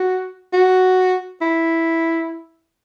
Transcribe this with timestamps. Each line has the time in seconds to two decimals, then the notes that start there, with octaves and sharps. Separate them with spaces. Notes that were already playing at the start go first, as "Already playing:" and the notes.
Already playing: F#4
0.53 F#4
1.42 E4